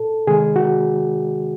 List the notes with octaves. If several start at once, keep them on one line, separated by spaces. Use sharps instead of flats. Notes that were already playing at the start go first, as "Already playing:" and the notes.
Already playing: A#2 A4
C3 D#3 G#3 G#4
F#4